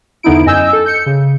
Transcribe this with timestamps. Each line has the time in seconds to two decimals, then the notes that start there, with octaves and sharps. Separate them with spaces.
0.23 E2 D3 B3 D#4 E4 D7
0.45 F#2 D#5 G#5 E6 G6
0.73 A4
0.86 G6 C#7
1.06 C#3